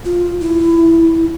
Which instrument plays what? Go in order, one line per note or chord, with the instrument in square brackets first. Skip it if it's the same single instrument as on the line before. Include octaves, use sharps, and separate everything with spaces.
[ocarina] F4
E4